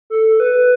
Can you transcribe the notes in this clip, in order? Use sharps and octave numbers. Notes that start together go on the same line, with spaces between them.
A4
B4